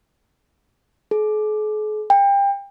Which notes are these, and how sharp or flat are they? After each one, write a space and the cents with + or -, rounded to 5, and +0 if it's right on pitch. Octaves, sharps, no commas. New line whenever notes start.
G#4 +45
G5 +30